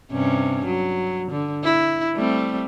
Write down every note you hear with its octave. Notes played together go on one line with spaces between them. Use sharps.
G2 C3 C#4
F#3
D3
E4
G3 A3 C4